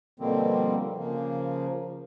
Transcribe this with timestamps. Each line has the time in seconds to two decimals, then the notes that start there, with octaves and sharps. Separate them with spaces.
0.20 B2 D3 F3 G3 A#3 C4
0.98 C#3 F3 A#3